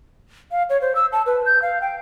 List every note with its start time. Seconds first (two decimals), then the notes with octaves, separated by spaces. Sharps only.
0.52 F5
0.70 C#5
0.81 C5
0.95 E6
1.13 A5
1.26 B4
1.46 G6
1.62 F5
1.81 G5